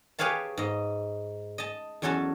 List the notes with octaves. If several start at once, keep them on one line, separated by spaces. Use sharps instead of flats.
G4 G#4 B4 C#5 F5 A5
G#2 D#5
D#5 A5
E2 F#3 C#4 F#4 A4 A5